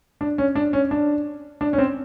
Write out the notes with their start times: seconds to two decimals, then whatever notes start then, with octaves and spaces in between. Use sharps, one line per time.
0.21 D4
0.38 C#4
0.55 D4
0.73 C#4
0.91 D4
1.61 D4
1.73 C#4
1.78 C4